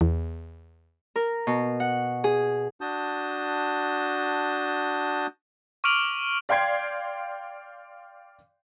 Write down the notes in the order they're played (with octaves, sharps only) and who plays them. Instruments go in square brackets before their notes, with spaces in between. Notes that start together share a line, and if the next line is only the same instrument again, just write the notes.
[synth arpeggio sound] E2
[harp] A#4
B2
F#5
G#4
[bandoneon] D4 F#4 A5 D#6 G6
[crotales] C#6 D6 F6 D7 F7 F#7
[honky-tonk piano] D5 F5 G5 C6 G#6 C7